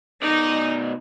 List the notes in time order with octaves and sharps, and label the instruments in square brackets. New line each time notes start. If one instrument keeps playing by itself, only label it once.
[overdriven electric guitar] B2 D5 [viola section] D#4